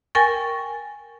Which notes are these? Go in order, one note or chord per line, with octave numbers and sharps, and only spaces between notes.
A#4 G5 G#5 C#6 A6